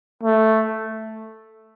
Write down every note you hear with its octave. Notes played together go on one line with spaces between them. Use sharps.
A3